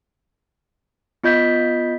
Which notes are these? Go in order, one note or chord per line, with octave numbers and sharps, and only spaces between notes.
B3 F4 D#5 G6 B6